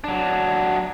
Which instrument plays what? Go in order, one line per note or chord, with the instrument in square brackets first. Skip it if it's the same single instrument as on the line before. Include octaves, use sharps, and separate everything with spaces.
[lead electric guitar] F#3 D4